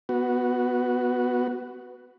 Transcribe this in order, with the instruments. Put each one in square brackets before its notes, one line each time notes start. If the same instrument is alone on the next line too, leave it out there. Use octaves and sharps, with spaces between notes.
[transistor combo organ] B3 F#4